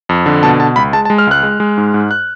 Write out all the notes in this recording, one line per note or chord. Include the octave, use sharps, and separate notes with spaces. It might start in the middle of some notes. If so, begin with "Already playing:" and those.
F2
D3
B2 A5
B2 A5
C#2 B5
G#3 A5
A5
G#3
F6
C#2 F#6
G#3
G#3
G#2
G#2
F#6